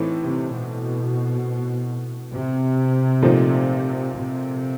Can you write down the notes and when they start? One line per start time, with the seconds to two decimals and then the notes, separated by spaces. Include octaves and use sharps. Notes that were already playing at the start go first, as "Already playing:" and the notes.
Already playing: A2 E3 A3 C4 D#4
0.24 C3
0.53 B2
2.32 C3
3.22 A#2 F3 A3 C4 D#4
4.13 C3